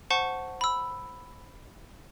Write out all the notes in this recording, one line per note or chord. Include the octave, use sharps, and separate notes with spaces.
C5 F#5 A5 C#6
B5 E6